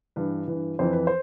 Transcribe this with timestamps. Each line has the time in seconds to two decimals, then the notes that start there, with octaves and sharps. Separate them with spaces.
0.16 G2 E3 B4
0.48 E3
0.53 G2
0.79 F2 E3 C5
0.92 B4
1.07 C5